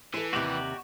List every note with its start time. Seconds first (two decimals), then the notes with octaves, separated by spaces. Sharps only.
0.14 E3 A4 C5
0.33 D#2 C3 F#4 G4 D5